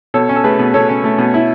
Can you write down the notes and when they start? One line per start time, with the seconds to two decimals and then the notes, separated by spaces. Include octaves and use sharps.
0.14 B2 A4 C#5
0.29 C#4
0.36 A4
0.44 A3 G#4 B4
0.59 B2
0.74 B2 A4 C#5
0.89 C#4
1.04 A3
1.18 B2
1.34 E4